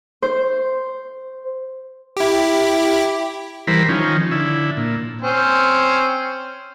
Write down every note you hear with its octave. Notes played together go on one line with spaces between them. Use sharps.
C5
E4 G4
E3 G3 A#4 C5 B5
D#3 F3 C#4
D3 E4
A#2
C4 C#4 C5